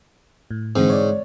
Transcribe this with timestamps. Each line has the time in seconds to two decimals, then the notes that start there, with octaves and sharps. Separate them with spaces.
0.51 A2
0.76 G#2 D3 E3 C4
0.89 C#5 D5